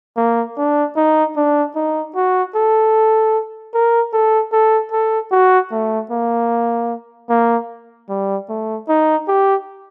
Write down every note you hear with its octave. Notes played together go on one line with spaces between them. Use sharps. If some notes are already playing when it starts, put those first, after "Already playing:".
A#3
D4
D#4
D4
D#4
F#4
A4
A#4
A4
A4
A4
F#4
A3
A#3
A#3
G3
A3
D#4
G4